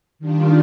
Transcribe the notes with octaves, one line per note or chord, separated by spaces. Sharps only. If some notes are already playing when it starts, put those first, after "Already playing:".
D#3 G3 D4 F4